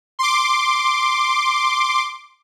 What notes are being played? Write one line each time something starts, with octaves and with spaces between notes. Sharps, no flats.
C6 D6